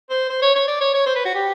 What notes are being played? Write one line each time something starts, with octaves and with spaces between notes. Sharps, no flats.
C5
C5
C#5
C#5
D5
C#5
C#5
C5
B4
F#4
G4